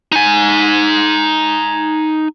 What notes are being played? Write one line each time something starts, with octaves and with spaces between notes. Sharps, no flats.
D#4 G#5